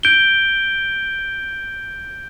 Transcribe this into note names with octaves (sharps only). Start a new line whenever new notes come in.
G6 D7 G7